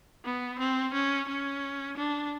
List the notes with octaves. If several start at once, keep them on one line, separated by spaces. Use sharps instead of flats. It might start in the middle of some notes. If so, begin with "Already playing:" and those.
B3
C4
C#4
C#4
D4